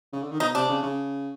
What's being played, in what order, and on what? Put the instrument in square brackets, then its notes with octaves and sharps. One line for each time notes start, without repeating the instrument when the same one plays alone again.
[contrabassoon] C#3
D3
D#3
[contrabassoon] B2 [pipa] D#4
[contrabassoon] C3 [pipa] D4
[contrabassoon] C#3
C#3